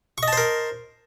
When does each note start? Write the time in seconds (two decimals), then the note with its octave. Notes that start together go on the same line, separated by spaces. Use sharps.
0.18 C#6
0.23 D#5
0.28 A5
0.33 C5
0.38 A#4